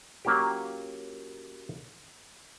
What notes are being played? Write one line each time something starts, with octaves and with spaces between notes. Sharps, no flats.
F#3 A#3 C#4 F4 G4